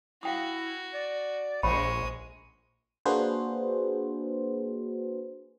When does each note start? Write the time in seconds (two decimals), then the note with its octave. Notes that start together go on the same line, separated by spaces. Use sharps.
0.23 E4 F#4 F5 G5 D#6
0.94 D5
1.63 A#1 G#3 C5 C#5 B5 C#6 D#6
3.06 A#3 D4 F#4 G#4 B4 C5